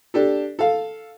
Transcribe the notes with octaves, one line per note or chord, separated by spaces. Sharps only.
D4 G4 A4
A4 F5